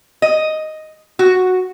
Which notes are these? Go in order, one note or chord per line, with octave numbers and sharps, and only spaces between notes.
D#5
F#4